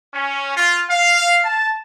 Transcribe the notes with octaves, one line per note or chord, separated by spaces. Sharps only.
C#4
F4
F5
A5